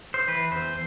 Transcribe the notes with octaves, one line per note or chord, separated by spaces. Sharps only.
C5
E3 B4
E2 C5